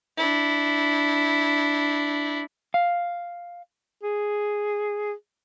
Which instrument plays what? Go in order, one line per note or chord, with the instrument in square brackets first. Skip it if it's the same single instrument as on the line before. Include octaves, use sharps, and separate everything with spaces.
[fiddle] D4 E4
[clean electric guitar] F5
[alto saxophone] G#4